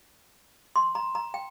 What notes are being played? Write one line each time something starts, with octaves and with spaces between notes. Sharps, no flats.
C6
A#5
A#5
G5